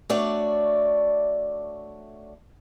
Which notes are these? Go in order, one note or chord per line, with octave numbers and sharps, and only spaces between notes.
A3 D4 F#4 C#5 D5